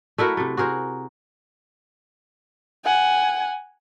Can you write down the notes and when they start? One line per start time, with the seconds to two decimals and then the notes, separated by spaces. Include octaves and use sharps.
0.18 A3 E4 F#4 A#4
0.37 C3 A3
0.57 F#4 G#4 A#4 C5
2.84 F#5 G#5